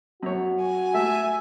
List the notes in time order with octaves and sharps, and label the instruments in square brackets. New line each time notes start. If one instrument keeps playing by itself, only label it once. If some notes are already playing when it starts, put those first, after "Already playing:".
[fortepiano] F#2 C#5 [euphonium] F#4
[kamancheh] G#5
[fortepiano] A3 [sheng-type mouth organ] E5